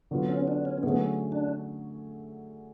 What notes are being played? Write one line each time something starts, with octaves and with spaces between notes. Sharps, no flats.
D3 F#3 B3 F4
C#4
D4
C#4
D3 F#3 A3 B3 C#4 G#4
D4